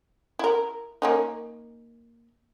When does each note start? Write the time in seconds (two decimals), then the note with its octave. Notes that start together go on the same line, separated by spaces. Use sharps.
0.39 E4 A#4
1.02 A#3 C#4 D#4